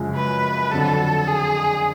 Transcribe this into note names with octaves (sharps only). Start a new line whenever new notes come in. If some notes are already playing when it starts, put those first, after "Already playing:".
Already playing: F#2 C#3 F3 G#3
B4
F2 D3 F#3 A4
G#4